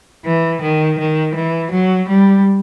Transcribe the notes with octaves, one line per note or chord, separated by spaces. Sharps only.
E3
D#3
D#3
E3
F#3
G3